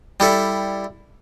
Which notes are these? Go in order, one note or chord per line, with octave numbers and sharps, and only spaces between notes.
G3 E4 A4